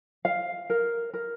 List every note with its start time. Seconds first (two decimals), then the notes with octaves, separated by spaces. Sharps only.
0.25 F5
0.70 A#4
1.14 A#4